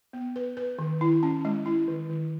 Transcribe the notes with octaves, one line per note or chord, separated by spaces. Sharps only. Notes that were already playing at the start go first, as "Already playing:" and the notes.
B3
B4
B4
D#3
E4
C#4
G#3
E4
D#3
D#3